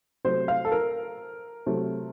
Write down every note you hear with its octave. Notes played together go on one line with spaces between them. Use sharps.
C3 F#3 A3 C5
F5
A4
A#4
C3 F#3 A3